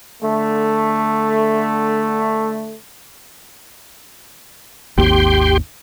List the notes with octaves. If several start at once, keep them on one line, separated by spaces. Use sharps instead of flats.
D3 A3
G#1 D#2 G4 G5 C6